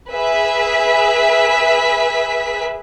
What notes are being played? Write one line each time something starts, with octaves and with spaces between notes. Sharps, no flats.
G#4 B4 E5 B6